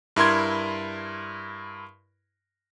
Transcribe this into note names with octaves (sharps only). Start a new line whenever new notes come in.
G2 E4 A#4 C6 G#6